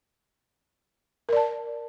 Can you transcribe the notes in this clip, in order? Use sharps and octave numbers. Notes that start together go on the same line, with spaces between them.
A#4 D5 A5